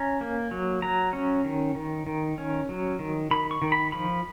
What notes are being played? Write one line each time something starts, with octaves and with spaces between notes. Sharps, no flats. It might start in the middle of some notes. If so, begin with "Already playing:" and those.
Already playing: C#4 A#5
A#3
F#3
F#3 A#5
C#4
D#3
D#3
D#3
C#4
F#3
D#3
D#3 B5
C#6
D#3
B5
F3 B5